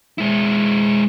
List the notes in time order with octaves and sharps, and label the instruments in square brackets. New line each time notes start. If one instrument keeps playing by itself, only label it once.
[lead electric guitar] G#3 E4